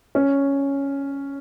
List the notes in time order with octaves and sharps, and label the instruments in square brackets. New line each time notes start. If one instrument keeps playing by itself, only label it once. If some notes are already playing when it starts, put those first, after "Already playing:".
[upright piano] C#4